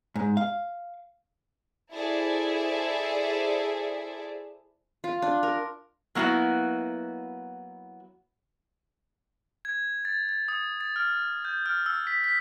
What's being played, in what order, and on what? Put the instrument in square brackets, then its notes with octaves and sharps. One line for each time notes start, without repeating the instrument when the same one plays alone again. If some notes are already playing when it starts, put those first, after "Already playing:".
[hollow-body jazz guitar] G#2
F5
[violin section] E4 G#4 A4 C5 D5 E5
[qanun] F4
D4
A#4
[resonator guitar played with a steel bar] F#3 A#3 B3 E4 F#4
[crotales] G#6
A6
A6
D#6
A6
F6
G6
F6
E6
B6
B6